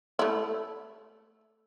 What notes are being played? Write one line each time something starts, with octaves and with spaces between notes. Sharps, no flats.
A3 E4